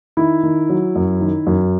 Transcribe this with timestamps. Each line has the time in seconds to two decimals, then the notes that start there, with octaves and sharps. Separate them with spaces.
0.17 D#3 E4
0.43 D#3
0.69 F#3
0.96 F#2
1.21 D#3
1.47 F#2